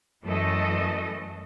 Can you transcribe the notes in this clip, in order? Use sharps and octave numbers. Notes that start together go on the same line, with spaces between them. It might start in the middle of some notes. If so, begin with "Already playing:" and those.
F#2 E3 A3 A4 D#5